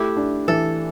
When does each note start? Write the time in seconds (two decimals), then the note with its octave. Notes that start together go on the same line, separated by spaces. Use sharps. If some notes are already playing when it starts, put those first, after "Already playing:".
Already playing: A3 E4 G4
0.17 D4
0.48 E3 A4